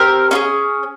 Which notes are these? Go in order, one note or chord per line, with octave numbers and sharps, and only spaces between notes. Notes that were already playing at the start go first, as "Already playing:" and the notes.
Already playing: C4 G4 A#4
C#4 F4 G#4